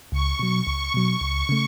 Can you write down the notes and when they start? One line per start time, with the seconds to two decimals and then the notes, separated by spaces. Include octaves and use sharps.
0.12 C#2 C#6
0.39 B2 F#3
0.67 C#2
0.94 B2 F#3
1.21 C#2
1.49 C#3 A3